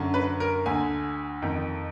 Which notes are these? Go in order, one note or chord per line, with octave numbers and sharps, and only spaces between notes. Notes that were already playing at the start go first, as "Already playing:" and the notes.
Already playing: F#2 D3
B4
A#4
D2 D3 G#5
F2 D#3